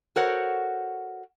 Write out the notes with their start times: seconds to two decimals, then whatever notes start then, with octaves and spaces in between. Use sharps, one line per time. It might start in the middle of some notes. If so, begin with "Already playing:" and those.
0.16 F#4 A4 A#4 C5 C#5 F#5